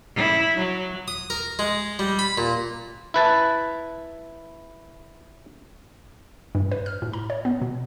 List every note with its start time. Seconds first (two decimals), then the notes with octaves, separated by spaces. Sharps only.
0.15 E4
0.58 F#3
1.08 D#6
1.30 A#4
1.59 G#3
1.99 G3
2.19 B5
2.38 A#2
3.14 E4 B4 A5
6.55 G2
6.72 B4
6.86 F6
7.02 A2
7.13 A#5
7.30 C#5
7.45 B3
7.62 B2